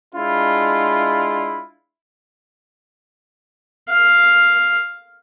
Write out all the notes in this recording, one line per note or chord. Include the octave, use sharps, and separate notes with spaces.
G#3 D4 E4 F4
F5